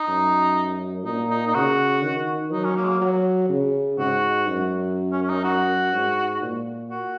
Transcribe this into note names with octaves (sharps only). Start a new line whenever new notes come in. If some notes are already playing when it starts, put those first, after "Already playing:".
Already playing: D#4
F#2
A#2 D#4
D#4
D#4
C#3 F#4
D#3
F#3 D#4
C#4
A#3
G#3
A#3
F#3
C#3
G#2 F#4
F#2
C#4
C#4
D#4
F#4
G#2
A#2
F#4